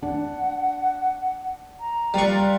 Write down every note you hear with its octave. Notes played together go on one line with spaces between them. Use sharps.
D4 F#5
A#5
G3 F4 B4 D5 C#6